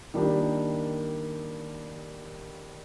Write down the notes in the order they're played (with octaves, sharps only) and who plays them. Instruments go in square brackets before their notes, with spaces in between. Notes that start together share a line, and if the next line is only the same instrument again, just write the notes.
[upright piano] D#3 G3 A#3 D4 G4